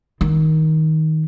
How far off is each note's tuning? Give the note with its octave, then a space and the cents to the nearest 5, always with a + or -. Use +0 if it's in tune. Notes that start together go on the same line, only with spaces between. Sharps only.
D#3 +15